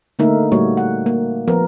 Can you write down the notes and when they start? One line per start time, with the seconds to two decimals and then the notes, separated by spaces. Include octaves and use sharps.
0.19 D3 A3 A#3 D#4 A#4 E5
0.52 A#2 G3 A3 A#3 F#4 C#5
0.77 F#5
1.06 A#3
1.48 F3 B3 A#4